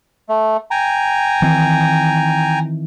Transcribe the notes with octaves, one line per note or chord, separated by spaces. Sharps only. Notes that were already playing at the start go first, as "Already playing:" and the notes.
A3
G5 G#5 A#5
D#3 E3 C4